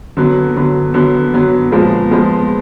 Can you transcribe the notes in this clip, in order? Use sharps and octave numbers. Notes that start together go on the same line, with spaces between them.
D3 F#3 B3
D3 F#3 B3
D3 F#3 B3
D3 F#3 B3
A#2 F3 G#3 B3
A#2 F3 G#3 B3